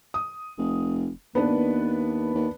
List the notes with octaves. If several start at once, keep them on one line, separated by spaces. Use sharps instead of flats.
D#6
F1
D#2 B3 D4 B4
D#2